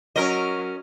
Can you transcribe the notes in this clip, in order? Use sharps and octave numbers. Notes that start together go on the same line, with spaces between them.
F#3 C#4 A#4 D#5